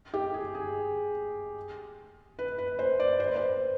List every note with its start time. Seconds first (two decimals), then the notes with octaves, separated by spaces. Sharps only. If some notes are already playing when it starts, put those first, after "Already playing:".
0.14 G4
0.34 G#4
0.55 G#4
2.39 B4
2.58 B4
2.79 C5
3.00 D5
3.20 C5
3.28 B4
3.36 C5